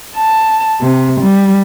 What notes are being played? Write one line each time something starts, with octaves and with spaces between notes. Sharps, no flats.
A5
C3
G3